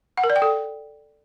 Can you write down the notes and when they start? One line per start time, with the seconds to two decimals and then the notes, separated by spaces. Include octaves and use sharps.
0.17 F#5
0.24 A#4
0.30 D5
0.36 G5
0.42 A4